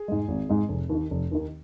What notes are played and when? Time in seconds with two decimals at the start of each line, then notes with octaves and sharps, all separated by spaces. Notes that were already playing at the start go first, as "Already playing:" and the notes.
Already playing: G#4
0.08 G#2 G#3
0.28 G#1
0.49 G#2 G#3
0.69 F1
0.89 D#2
0.95 D#3
1.11 F1
1.31 D#2 D#3